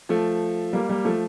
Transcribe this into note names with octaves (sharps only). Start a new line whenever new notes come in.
F3 A3
G3 A#3
G3 A#3
F3 A3